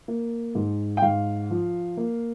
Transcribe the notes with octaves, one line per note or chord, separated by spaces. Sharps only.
A#3
G#2
G5
G#2 F5
F3
A#3